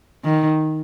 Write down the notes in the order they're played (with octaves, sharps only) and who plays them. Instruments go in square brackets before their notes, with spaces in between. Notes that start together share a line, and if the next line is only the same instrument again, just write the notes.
[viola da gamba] D#3